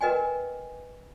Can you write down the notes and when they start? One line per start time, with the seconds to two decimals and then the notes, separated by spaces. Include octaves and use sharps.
0.01 A#4 B4 D#5 G5 G#5